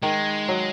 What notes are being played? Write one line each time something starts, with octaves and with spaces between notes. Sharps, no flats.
D#3 G#3
F#3